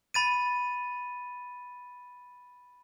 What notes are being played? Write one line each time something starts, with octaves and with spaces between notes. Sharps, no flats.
B5 A6 D#7